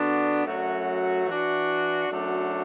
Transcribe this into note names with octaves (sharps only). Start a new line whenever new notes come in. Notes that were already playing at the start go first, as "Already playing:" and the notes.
Already playing: D3 B3 D4 F#4
F#2 F#3 A3 F#4
E3 D4 F#4
F#2 F#3 A3 D4 F#4